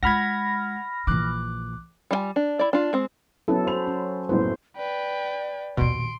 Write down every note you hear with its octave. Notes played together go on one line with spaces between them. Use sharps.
G#3 F4 F#5 B5 F6 G#6 A#6
A#1 E3 D6 F#6
G3 D4 F4 G#5
D4
E4 D5
D4 F4
G#3 C4
F#3 B3 C#4 E4 A4
C5 B5 F7
C#4
F#1 A2 B3 C5
B4 D5 G5
A#1 D#2 B2 C6 D7